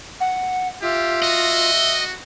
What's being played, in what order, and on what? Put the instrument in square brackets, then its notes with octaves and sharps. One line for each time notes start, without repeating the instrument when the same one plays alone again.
[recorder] F#5
[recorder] F4 [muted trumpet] G4 [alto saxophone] E5
[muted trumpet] F#4 [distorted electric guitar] D#5